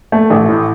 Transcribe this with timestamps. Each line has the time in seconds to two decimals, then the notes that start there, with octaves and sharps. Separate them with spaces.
0.12 A3
0.30 A1
0.49 A2